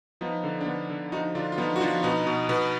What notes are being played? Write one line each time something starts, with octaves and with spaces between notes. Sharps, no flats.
F3 B3 D#4
D3
D4
D3 B3
D3
F3 D#4 F#4
D3 D4 F4
F4
F3 B3 D#4
F#4
F3 D4 F4
B2 B3 D#4
B2
B2 B3